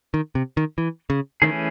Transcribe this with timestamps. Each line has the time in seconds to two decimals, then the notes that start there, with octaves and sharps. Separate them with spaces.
0.14 D#3
0.35 C3
0.57 D#3
0.78 E3
1.10 C#3
1.42 D#3 E3 A3 C#4 G#4